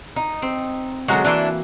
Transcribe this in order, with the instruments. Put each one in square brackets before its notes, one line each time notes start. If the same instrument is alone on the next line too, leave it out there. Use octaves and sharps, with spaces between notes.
[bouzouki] D#4
[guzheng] C4
[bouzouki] D3 F#3 G#3 [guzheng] F#4 A#4
[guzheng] E3 A#3 C6 [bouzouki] D4 E4